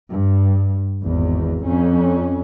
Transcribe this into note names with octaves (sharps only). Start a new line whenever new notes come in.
G2
G#1 E2
F2 C#4